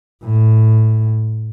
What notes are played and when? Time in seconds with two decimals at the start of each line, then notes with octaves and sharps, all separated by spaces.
0.23 A2